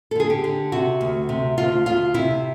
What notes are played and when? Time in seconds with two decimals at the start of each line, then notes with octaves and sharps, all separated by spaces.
0.11 A4
0.16 D3 G#4
0.30 G4
0.44 D3
0.72 C3 F#4
1.01 D2
1.29 C3
1.58 D2 F4
1.86 D2 F4
2.14 C3 E4